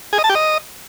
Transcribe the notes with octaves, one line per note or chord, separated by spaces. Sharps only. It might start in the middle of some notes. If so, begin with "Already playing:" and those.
G#4
D#5
A5
G4
D#5